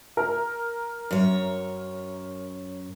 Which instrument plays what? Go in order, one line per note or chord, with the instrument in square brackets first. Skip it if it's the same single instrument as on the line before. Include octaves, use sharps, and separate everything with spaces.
[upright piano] A#4
[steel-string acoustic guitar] F#2 C#5